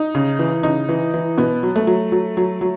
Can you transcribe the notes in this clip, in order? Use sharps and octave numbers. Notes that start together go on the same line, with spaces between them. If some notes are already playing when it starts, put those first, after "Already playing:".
Already playing: D#4
C#3
E3
C#3 D#4
E3
E3
B2 B3
F#3
A3
F#3
F#3
F#3
F#3